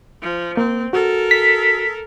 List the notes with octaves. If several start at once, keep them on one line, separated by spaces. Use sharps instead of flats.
F3
A#3 C4
F#4 A4 A#4
B6